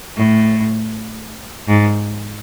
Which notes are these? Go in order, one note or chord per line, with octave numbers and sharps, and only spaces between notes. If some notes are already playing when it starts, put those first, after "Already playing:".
A2
G#2